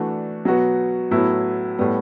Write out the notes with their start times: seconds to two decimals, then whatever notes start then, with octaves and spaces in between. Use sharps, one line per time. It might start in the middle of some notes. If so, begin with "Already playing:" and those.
Already playing: E3 A3 D4 F#4
0.45 B2 F#3 B3 F#4
1.11 A2 F#3 B3 E4
1.79 A2 G3 B3